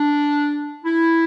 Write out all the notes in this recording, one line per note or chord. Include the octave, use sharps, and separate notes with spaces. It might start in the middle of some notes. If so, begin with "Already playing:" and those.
Already playing: D4
E4